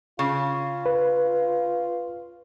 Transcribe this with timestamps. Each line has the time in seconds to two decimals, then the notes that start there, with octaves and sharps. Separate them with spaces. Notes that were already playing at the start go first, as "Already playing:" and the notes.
0.19 C#3 F4
0.86 B4